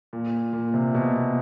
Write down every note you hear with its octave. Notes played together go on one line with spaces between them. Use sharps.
A#2
A#2
C3
B2